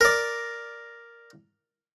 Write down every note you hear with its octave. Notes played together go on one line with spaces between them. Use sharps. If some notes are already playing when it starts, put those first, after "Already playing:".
A#4 D5